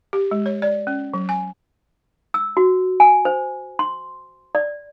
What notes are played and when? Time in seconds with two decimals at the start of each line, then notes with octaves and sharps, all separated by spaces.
0.13 G4
0.31 G#3
0.46 C#5
0.62 D5
0.87 C#4
1.14 F#3
1.29 G#5
2.34 E6
2.57 F#4
3.00 G#5
3.25 C5
3.79 C6
4.55 D5